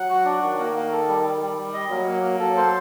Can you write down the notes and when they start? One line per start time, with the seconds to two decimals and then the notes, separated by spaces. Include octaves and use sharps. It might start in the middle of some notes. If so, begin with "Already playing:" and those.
Already playing: F#3 F#5
0.10 F#4
0.25 D4
0.42 D#3 F#4
0.59 A#3
0.75 A#3
0.92 A4
1.08 G3
1.24 G3
1.41 G3
1.57 G3
1.74 D#5
1.90 F#3 A#3
2.06 A#3
2.23 A#3
2.39 F#3 A4
2.57 C5